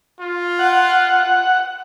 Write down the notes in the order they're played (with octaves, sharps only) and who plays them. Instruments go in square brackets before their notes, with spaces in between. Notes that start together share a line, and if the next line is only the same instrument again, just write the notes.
[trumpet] F4
[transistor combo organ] F#5